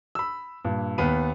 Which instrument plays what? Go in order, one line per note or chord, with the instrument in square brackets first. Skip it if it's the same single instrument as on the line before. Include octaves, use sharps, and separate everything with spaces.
[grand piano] B5 E6
G2 A#2
D#2 B3 B5 D#7